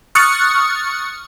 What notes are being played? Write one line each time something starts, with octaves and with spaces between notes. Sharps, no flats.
C#6 D#6 F6 F#6 A6 C#7